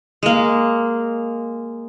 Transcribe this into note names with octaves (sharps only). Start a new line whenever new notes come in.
G#3 A#3